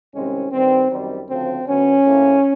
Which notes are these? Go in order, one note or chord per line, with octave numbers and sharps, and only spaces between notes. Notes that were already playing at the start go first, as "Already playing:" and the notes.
C2 C3 D#3 G#3 C4 C#4
G2 D#3 G3 C4
F#2 D#3 G3 C4
D2 C#3 F3 C4
D2 D3 F#3 B3 C#4
A2 F3 A#3